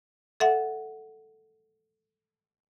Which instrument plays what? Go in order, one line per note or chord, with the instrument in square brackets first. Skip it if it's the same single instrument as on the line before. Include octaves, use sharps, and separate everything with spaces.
[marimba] A4 E5 F#5